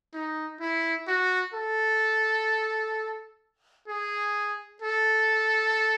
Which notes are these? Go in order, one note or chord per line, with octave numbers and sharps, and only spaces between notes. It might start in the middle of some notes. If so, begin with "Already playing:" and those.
D#4
E4
F#4
A4
G#4
A4